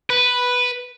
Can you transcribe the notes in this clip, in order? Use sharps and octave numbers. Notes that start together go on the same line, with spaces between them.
B4